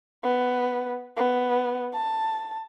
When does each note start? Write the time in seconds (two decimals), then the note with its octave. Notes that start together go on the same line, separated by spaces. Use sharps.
0.23 B3
1.17 B3
1.94 A5